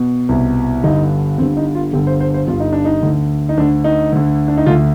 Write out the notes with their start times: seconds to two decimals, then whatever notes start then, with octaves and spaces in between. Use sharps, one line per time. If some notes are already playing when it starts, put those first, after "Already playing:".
Already playing: B2
0.29 C2 B2
0.84 G1 G2 D3 D#4
1.38 G1 G2 D3 C4
1.57 D#4
1.75 F4
1.93 G1 G2 D3 G4
2.07 C5
2.20 C5
2.34 C5
2.47 G1 G2 D3 F4
2.60 D#4
2.73 D4
2.85 D#4
3.03 D2 D3
3.49 D#4
3.57 D2 D3 D4
3.84 D#4
4.12 D2 D3
4.48 D4
4.57 D#4
4.66 D2 D3 F4